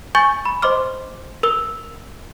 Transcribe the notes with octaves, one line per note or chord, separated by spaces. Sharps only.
G#5 C#6 G6 A6 G7
B5
C5 D#5 C6 D6 F6
A#4 E6 G7